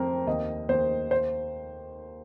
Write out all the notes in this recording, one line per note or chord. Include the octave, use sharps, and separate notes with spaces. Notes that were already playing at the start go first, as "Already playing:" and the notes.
Already playing: F2 C4 A#4 C5
D#2 D#5
D#2 C5
C5